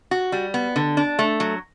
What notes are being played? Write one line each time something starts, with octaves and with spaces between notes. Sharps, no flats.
F#4
G3
B3
D3
D4
A3
F#3